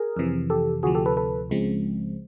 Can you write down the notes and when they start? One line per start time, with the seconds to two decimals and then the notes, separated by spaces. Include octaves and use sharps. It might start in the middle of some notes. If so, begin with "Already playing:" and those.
Already playing: G#4 A#4
0.17 F2 C3 E3
0.50 G4 A4
0.83 D2 C3 F3 F#4 G#4
0.95 G4 A4
1.06 A4 B4
1.17 A4 B4
1.50 C#2 C#3 F3 G#3 C4